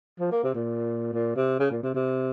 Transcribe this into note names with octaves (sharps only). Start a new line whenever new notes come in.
F3
A#3
C3
A#2
A#2
C3
C#3
A#2
C3
C3